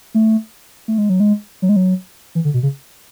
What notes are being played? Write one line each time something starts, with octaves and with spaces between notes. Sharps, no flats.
A3
A3
G#3
F#3
G#3
F#3
G#3
F#3
E3
D3
B2
C#3